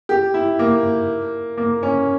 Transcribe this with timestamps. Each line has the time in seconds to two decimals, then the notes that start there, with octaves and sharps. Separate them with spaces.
0.09 G4
0.34 E4
0.59 A#3
1.57 A#3
1.83 C#4